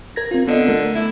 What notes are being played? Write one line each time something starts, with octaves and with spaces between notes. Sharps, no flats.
A#4 G#6 A#6
C4 F4
D3 B3 D#5
A3 A#4
E4